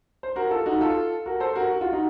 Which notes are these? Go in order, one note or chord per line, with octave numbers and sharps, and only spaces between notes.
C5
F#4 A#4
F4 A4
D#4 F#4
F4 A4
F#4 A#4
A4 C5
F#4 A#4
F#4
F4
D#4 F#4